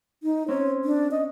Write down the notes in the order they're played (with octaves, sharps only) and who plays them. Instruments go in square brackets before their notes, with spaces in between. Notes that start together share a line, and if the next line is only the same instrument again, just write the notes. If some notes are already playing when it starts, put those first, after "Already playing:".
[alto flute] D#4
[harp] C4 C#4 [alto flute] C#5
[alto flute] D4
D#5